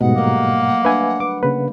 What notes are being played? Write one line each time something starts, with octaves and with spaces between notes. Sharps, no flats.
G#2 B2 G3 A3 D#5 F#5
F#3 A#3 A#4
D4 B4 E5 G#5
B4 D6
C#3 A#3 B4